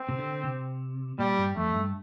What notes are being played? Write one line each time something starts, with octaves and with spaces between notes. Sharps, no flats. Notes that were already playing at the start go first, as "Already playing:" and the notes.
Already playing: C4
C3
D3
C3
A#2 G3
G2
F2 A3
G2